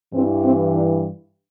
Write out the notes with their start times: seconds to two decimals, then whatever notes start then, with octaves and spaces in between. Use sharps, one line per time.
0.13 G2 E3 C4
0.43 C4
0.72 D4